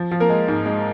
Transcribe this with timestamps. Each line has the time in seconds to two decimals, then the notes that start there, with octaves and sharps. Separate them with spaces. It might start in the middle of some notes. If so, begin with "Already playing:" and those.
Already playing: F3
0.11 F3
0.20 A#3 A#4
0.29 G#3
0.48 G#2
0.66 G#3